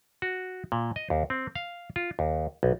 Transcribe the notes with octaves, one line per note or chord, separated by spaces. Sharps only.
F#4
A#2
D#5
D#2
C4
F5
F4
D#2
B1